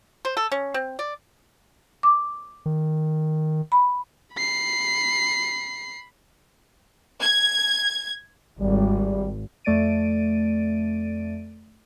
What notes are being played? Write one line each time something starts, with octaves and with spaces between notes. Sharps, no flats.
C5
A4
C#4
C4
D5
D6
D#3
B5
B5 C7
G#6
G#1 G3
F2 A3 D5 A6 D7 D#7